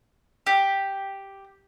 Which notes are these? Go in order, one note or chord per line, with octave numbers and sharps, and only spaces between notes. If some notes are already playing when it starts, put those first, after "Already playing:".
G4